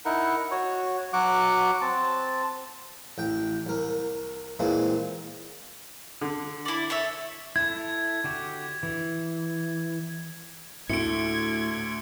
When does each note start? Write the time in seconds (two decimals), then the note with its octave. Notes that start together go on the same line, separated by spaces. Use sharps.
0.05 D#4 E4 A#4 F#5
0.51 F#4 C#5
1.13 F#3 F#4 F#5 D6
1.81 C4 A5
3.18 A1 G5
3.66 C2 A#4
4.59 A#2 E3 G#3 A#3 C4
6.21 D3
6.65 E4 D5
6.90 A4 C#5 E5
7.56 E4 A4 G#6
8.24 D3 F#4 G4
8.83 E3
10.90 D2 A2 D3 G#6 C#7 D7